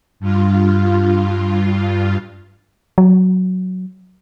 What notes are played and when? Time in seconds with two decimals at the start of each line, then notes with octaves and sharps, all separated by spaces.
0.20 G2 F4
2.98 F#3